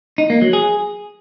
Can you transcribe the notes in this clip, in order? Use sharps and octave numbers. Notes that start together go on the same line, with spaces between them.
D#4
A#3
F#3
G#4